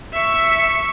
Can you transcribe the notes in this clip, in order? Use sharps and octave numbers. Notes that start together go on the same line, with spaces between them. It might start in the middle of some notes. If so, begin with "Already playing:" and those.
E5 C#6